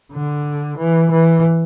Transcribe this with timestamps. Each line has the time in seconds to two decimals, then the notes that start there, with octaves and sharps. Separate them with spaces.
0.13 D3
0.78 E3
1.11 E3